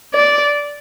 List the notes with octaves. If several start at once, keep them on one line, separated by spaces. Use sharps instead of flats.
D5